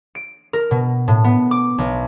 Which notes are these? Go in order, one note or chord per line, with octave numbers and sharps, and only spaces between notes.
D7
A#4
B2
A2
B3
D6
B1